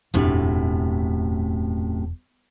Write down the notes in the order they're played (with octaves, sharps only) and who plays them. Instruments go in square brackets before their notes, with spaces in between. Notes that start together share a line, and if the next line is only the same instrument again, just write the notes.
[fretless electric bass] E1 D4 [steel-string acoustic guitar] F#2 A2 C3